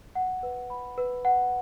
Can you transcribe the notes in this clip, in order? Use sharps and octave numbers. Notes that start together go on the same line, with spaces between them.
F#5
B4
B5
B4
F#5